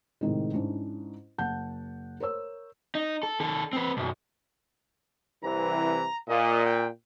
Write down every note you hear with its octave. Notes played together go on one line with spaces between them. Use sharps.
A2 C3 D#3 G#3
G#2 C#4 D4 E4
F#1 F#5 A5 G6
A#4 C5 C#5 E6
D#4
A4
D#3 A4
C4 B4
B1 F#2
C2 C3 E3 A#5
A#2 D#5
G5